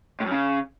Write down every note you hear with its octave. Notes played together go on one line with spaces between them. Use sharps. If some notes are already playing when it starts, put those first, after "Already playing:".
A2
F#2
C#3